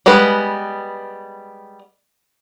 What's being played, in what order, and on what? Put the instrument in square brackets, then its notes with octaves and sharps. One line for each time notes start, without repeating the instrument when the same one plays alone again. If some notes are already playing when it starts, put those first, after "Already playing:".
[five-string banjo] G3 G#3 B3 B4